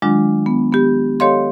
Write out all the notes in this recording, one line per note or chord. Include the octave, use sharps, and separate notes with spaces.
D#3 F#3 G#3 D4 F4
B3
B3 G4
G4 A4 C#5 D#5 F5 C6